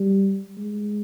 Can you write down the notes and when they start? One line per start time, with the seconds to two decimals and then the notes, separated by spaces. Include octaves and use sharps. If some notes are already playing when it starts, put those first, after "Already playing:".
Already playing: G3
0.57 G#3